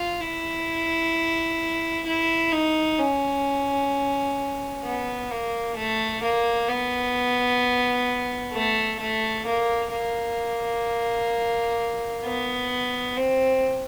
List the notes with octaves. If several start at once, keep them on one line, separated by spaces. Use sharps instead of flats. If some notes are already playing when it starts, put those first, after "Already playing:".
Already playing: F4
E4
E4
D#4
C#4
B3
A#3
A3
A#3
B3
A3
A3
A#3
A#3
B3
C4